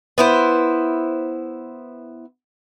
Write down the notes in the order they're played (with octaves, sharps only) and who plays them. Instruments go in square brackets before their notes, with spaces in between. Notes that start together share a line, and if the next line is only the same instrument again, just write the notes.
[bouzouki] B3 E4 C5